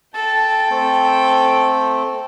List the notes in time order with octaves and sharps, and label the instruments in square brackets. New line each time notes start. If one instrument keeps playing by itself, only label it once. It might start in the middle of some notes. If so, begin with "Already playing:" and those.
[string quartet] A4 G5 [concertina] A5
[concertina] A3 C4